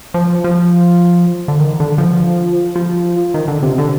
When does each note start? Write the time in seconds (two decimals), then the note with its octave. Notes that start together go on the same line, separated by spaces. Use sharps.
0.14 F3
0.44 F3
1.48 D3
1.60 D#3
1.80 D3
1.98 F3
2.75 F3
3.34 D#3
3.48 D3
3.63 C3
3.78 D3